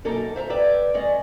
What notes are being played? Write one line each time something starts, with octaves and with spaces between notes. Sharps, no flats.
F#2 B2 A#3 D#4 A4 A#4
C5 E5 F5 A#5
B4 D5 E5 G5
G#3 C#4 D5 D#5